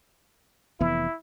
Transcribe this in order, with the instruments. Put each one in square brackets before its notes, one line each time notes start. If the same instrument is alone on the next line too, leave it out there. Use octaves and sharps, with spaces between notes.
[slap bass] F1 E3 B3 [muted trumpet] E4